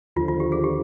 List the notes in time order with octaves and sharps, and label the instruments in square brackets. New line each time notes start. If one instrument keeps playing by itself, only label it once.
[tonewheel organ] D#2 D3 F3 [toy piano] F4
[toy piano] F4
G4
G#4
G4